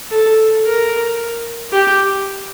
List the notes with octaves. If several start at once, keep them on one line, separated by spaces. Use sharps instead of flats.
A4
A#4
G4